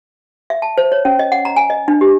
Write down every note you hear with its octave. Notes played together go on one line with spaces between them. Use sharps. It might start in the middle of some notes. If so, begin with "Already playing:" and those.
E5
A5
C5
C#5
C#4
D#5
F#5
A#5
G#5
D#5
D4
G4